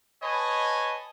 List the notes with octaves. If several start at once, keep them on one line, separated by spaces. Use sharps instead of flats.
B4 C#5 D#5 G#5 A5